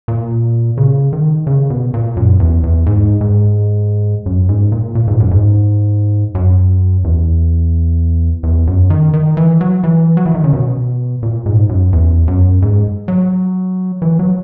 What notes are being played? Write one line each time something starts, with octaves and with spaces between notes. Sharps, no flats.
A#2
C#3
D#3
C#3
B2
A#2
F#2
E2
E2
G#2
G#2
F#2
G#2
A#2
A#2
G#2
F#2
G#2
F#2
E2
E2
F#2
D#3
D#3
E3
F#3
E3
F#3
E3
D#3
C#3
B2
A#2
G#2
F#2
E2
F#2
G#2
F#3
E3
F#3